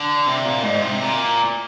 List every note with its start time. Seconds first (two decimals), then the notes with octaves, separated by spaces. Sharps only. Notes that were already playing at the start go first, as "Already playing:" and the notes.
Already playing: D3
0.26 C3
0.45 A#2
0.63 G#2
0.81 C3
1.01 A#2